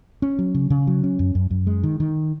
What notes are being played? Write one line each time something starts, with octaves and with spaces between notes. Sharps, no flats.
C#4
F#3
C#3
C#3
F#3
C#4
F#2
F#2
F#2
G#3
D#3
D#3